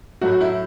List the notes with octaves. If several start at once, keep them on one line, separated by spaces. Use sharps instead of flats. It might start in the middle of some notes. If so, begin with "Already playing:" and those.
A2 F#3 A3 F#4
E4